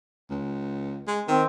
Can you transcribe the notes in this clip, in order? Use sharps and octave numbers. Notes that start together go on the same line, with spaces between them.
C#2
G#3
D#3 C4